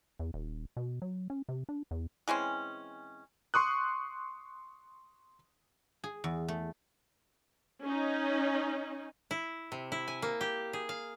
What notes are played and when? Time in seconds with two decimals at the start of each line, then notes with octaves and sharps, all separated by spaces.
0.19 E2
0.34 D#1
0.77 B2
1.02 F#3
1.30 C#4
1.49 C3
1.69 D4
1.91 E2
2.28 E3 G#3 C4 C#4
3.54 C6 C#6 D#6 F#6
6.04 G#4
6.24 E2
6.48 A3
7.85 C#4 D#4
9.31 E4
9.72 C3
9.92 E4
10.08 G#5
10.22 A#3
10.41 G4
10.73 G#4
10.89 F5